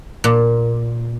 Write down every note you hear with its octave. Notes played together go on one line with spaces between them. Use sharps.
A#2